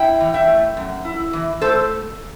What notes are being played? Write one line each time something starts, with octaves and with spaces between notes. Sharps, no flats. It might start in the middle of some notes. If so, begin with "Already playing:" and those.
Already playing: E4 E5 G5
E3
E5 G5
A3
F#2
E4
E3
A3 A4 C5